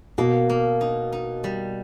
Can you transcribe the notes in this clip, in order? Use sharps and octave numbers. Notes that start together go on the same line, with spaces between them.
B2 A#3
A#3
D#4
D#4
G3